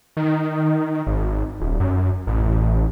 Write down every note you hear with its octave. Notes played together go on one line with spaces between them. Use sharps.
D#3
G#1
D#1
F#2
A1